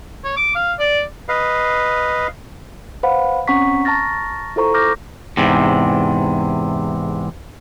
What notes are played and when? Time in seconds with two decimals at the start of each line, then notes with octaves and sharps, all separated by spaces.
0.24 C#5
0.37 D6
0.55 F5
0.79 D5
1.29 B4 D#5 F5
3.03 B4 C5 F5 F#5 B5
3.48 C4 C#4 F#5 A#5 C#6 B6
3.85 A5 A#5 C#6 F6 A6 A#6
4.56 E4 F4 A4 C5 A#5 C#6
4.74 D6 F6 G6 A#6
5.37 E2 G#2 C3